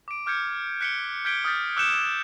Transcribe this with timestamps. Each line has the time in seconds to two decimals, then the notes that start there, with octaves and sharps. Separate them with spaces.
0.08 D6 D7
0.26 D6 F6 G6 G#6 C#7
0.81 F#6 B6 C#7 D7 G7
1.25 F6 G6 G#6 B6 D7 G7
1.45 D#6 F6 G6 A6 B6
1.76 D6 E6 F#6 G6 C#7 E7